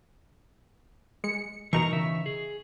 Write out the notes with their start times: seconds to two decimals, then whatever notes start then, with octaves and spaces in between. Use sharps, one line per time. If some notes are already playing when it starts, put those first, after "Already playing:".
1.24 G#3 C#7
1.73 B2 E3 D#4 A#4 A#5 C#6
1.93 C#3 E3 E5
2.26 G#4